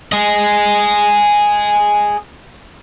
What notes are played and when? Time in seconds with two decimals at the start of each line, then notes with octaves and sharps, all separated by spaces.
0.12 G#4 D#5